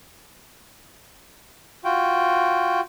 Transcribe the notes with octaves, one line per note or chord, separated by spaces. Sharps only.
F4 F#4 G5